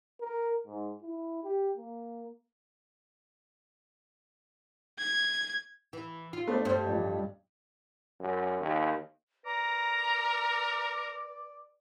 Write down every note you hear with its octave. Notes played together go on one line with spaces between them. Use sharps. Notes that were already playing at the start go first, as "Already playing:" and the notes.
A#4
G#2
E4
G4
A#3
G#6
E3
F4
A3 B3 C4 D4
G2 C5
A1 F3
F#2
D#2
A#4 B4 D5 A#5